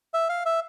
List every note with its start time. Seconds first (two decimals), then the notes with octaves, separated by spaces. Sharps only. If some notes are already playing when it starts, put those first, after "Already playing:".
0.14 E5
0.29 F5
0.46 E5